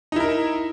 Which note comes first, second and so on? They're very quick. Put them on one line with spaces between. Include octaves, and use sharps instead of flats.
D#4 E4 A#4